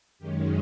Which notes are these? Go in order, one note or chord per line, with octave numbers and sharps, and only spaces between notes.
F#2 D#3 G#3 C#4 G4